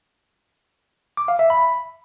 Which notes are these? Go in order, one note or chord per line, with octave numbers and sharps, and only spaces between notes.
D6
F5
E5
B5